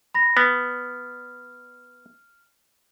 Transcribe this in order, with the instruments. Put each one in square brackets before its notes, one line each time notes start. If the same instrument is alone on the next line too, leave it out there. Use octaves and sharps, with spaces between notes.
[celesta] B5 A#6
[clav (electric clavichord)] B3 [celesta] F6